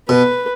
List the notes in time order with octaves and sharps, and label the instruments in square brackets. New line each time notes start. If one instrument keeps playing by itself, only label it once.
[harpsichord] B2 [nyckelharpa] B4